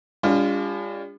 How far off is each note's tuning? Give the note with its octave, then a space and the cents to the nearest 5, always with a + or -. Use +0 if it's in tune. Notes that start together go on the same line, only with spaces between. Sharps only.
G3 +45 D4 -40 F4 +0